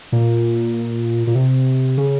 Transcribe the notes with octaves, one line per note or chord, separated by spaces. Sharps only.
A#2
A#2
C3
C#3